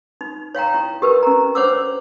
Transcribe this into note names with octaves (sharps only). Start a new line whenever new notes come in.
D#4
C#5 F5 G5 A#5
E4
G4 A#4 B4
C#4 A#5
D4 C5 C#5 F#5 D6 E6